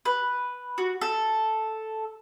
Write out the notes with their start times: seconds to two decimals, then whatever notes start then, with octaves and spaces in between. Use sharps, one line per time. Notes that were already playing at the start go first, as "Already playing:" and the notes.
0.05 B4
0.78 F#4
1.01 A4